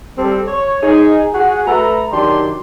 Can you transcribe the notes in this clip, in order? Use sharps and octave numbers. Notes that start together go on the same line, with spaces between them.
G3 C4 A4
C#5
D#4 G#4
F#4 G#4 F#5
A3 A4 B4 A#5
D#3 F#3 D4 G4 D5 C6